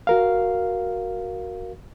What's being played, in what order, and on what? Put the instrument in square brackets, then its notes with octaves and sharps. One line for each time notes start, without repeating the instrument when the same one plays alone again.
[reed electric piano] F#4 A#4 F5